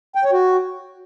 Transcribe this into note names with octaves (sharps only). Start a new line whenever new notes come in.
G5
C#5
F#4